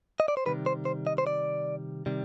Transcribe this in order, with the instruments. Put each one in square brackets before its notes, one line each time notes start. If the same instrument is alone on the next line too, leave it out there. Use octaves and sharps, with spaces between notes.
[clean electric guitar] D#5
D5
C5
C3 D#3 G3 B4
C5
C5
D#5
C5
D5
C3 D#3 G3